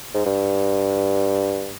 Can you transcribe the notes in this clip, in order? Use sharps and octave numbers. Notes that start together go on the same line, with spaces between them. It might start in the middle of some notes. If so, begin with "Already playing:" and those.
G#2
G2